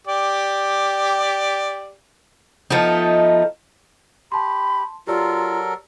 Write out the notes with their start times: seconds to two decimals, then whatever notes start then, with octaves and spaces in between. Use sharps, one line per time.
0.07 G4 D5
2.70 F3 A3 B3 D#4
4.32 G4 A5 B5 C6
5.07 F#3 F4 G4 A4 A#4 D5